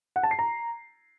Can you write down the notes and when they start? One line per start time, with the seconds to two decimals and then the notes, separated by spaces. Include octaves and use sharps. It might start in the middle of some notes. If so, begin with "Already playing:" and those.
0.16 F#5
0.23 A5
0.31 C7
0.39 A#5